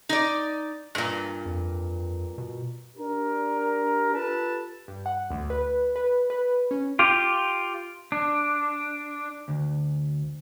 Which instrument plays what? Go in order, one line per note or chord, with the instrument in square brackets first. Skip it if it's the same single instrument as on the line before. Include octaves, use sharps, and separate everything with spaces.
[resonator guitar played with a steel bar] D#4 D5
G2 A#2
[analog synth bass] F2
B2
[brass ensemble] D4 G4 A#4
F4 G4 A4 B4 A5
[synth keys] G2
F#5
D2
B4
B4
B4
C#4
[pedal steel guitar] F4 G4
D4
[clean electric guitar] D2